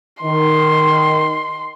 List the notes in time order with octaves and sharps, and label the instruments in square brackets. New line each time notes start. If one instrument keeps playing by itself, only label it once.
[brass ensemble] D#3 [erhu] C6